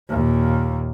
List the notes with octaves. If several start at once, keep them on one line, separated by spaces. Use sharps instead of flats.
D#2 A#2